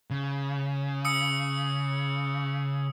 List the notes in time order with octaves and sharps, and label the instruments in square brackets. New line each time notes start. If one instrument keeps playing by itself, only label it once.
[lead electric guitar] C#3
[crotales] D#6 E6 C#7